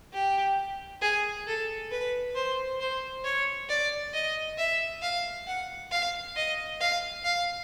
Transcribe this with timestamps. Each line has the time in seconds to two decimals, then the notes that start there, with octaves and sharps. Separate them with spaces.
0.14 G4
1.02 G#4
1.47 A4
1.91 B4
2.35 C5
2.80 C5
3.24 C#5
3.69 D5
4.14 D#5
4.58 E5
5.02 F5
5.47 F#5
5.91 F5
6.36 D#5
6.81 F5
7.25 F5